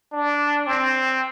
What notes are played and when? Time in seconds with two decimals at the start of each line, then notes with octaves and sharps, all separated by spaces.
0.12 D4
0.66 C4